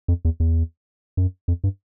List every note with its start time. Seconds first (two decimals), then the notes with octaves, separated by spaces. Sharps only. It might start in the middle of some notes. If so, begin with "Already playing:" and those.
0.08 F2
0.25 E2
0.40 E2
1.17 F#2
1.48 F2
1.64 G2